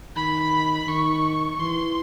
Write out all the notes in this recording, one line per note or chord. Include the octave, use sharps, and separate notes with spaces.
D#3 B5
D#3 C#6
E3 C6